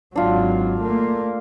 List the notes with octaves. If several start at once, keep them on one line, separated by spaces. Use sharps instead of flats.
G#1 F#3 D4 F4
A3 A#3